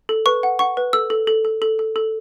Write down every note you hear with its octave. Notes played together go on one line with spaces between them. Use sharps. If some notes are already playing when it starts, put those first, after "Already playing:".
A4
B4 C#6
F#5
F#5 C#6
B4
A4 E6
A4
A4
A4
A4
A4
A4